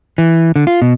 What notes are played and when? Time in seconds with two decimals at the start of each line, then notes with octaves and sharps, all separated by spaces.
0.18 E3
0.56 D3
0.67 F4
0.82 B2